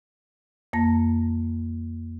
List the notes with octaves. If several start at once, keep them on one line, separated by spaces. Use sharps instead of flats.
F2 A#3 A5 A#6